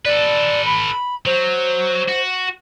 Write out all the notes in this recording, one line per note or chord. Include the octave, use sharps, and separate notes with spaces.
A4 B4 D5
B5
F#3 C5
F#4